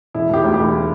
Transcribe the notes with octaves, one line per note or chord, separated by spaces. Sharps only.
E1 E4
E1 G4
D2
E1 G4